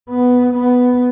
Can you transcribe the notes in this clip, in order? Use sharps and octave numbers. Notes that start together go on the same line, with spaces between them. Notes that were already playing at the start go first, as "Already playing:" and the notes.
B3
B3